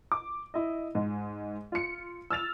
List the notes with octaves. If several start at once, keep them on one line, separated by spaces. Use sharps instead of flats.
D6
E4 D#5
G#2 G#3
F4 C#7
E6 F6 A6 F7